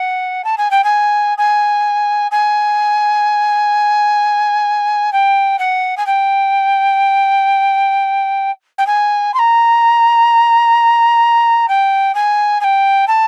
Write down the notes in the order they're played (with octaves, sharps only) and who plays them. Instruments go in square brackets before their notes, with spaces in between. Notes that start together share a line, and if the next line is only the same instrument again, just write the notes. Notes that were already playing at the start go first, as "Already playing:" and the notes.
Already playing: [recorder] F#5
A5
G#5
G5
G#5
G#5
G#5
G5
F#5
G#5
G5
G5
G#5
C6
A#5
G5
G#5
G#5
G5
A5